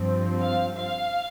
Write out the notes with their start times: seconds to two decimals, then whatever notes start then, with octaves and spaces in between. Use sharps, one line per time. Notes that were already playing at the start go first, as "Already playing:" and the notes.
Already playing: G2 F3 C4
0.41 F5
0.75 F5